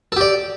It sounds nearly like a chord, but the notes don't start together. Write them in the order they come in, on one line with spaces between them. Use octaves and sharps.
A4 G4 D5